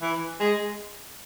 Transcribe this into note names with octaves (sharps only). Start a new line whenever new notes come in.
E3
G#3